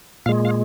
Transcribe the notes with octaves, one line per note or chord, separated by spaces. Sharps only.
A#2 G#3 F5
F5